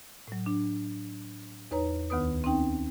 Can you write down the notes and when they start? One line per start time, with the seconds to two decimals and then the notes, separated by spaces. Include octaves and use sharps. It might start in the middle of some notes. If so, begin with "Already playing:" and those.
0.28 A2 F#3
0.46 D4
1.71 E2 D#4 B4 C#5 A#5
2.10 D2 D#3 B3 B4 D#6
2.44 C4 C#4 D#4 G5